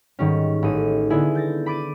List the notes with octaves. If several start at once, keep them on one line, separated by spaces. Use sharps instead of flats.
G#2 D#3 G3 C#4
A1 D#4 D#7
D3 B3 E4 G#4
G6 A6 A#6
B5 D6 A6 D7 D#7